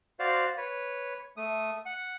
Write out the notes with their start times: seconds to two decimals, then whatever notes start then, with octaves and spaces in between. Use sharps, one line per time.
0.19 F#4 C5 D5 F5
0.57 B4 C#5
1.37 A3 D#6
1.85 F#5